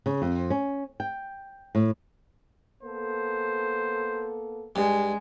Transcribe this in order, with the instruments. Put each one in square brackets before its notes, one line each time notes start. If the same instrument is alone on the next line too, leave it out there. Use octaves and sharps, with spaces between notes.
[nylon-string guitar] C#3
F2
C#4
G5
A2
[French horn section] A#3 B3 A4 [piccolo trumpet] C5
[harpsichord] G2 [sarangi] G#3